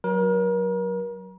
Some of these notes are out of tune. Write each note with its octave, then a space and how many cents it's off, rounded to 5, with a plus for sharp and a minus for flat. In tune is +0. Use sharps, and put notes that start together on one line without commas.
F#3 +0 A#4 +35